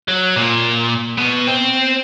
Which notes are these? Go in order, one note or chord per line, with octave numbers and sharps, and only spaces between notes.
F#3
A#2
B2
C4